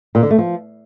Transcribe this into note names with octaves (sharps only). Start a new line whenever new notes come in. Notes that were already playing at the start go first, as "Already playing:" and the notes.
A#2
D3
A3
F3